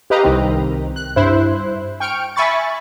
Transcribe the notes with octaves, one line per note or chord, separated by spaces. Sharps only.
G4 B4 D#5 F5 A#5
C2 D#3 C4
F#6
G2 E4 C5 F#6
G5 C#6 F6 D7
E5 G#5 B5 C#6 A6